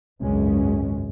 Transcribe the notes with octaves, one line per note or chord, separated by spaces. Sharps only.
G#1 C#2 F#2 G#3 C#4